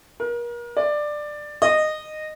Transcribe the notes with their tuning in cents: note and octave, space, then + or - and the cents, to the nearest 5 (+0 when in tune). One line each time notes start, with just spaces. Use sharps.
A#4 +35
D5 +15
D#5 -15